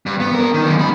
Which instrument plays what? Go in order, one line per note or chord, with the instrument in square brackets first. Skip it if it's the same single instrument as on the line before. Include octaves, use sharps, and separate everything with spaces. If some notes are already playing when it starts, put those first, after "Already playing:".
[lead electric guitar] G2
B3
D4 A#4
D#3
F#2 D3
G#3 B5